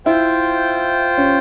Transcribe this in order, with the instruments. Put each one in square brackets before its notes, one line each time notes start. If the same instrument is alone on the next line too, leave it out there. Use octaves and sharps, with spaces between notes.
[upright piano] E4 [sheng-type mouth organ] F4 C5 G5
[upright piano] C#4